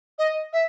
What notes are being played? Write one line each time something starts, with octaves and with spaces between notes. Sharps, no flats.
D#5
E5